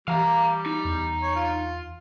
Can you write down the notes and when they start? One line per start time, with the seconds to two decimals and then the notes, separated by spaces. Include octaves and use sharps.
0.08 E3 G3 F5 A#5
0.66 D#4
0.85 E2
1.22 C#5
1.36 F4